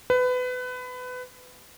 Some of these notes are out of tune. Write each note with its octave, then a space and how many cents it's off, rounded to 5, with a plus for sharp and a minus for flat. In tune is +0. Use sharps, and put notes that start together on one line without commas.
B4 +25